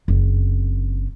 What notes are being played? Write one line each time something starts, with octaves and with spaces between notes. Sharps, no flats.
F#1 C4